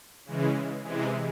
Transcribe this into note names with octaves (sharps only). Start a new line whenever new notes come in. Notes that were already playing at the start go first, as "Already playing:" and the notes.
C#3 E3 G#3
C3 E3 G#3